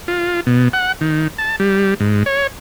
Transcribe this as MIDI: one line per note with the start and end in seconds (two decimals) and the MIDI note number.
0.08 0.40 65
0.47 0.69 47
0.73 0.92 78
1.01 1.28 51
1.38 1.56 81
1.60 1.94 55
2.00 2.23 44
2.26 2.47 73